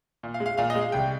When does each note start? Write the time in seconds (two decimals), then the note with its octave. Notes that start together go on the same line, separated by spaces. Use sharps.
0.23 A#2
0.34 F5
0.40 G#3
0.46 F5
0.57 A#2 F5
0.70 D#5
0.75 G#3
0.81 F5
0.92 C2 G5